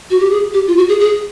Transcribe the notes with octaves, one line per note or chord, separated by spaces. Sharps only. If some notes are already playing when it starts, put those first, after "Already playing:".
F#4
G4
G#4
G4
F4
F#4
G#4
G#4